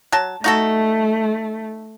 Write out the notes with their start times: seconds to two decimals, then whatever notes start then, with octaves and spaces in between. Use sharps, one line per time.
0.12 F#3 A5
0.44 A3 D#4 F#4 A4